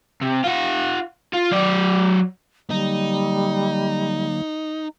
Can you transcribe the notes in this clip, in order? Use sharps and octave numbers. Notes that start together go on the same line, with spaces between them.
C3
F4 F#5
F4
F#3 D5
D3 F#3 G3 A#3 D#4